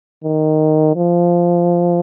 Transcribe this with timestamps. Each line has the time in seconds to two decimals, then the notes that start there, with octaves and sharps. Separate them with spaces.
0.24 D#3
0.95 F3